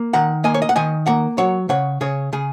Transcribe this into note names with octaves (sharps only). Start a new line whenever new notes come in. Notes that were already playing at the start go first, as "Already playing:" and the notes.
Already playing: A#3
D#3 F#5 A#5
A#3 D#5 G#5
C#5
D#5
F#5
D#3 D#5 G#5
A#3 F#5 A#5
F#3 C#5 F#5
C#3 C#5 F#5
C#3 G#4 C#5
C#3 G#4